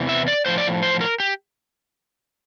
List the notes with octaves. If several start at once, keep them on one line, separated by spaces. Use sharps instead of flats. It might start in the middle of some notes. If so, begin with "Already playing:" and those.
Already playing: E2 C3 E3
E5
D5
A2 F3 C5
D5
C5
A#4
G4